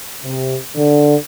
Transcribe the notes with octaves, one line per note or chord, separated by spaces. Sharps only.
C3
D3